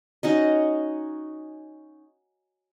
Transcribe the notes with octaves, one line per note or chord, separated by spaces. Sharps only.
C#4 D#4 F#4 D#5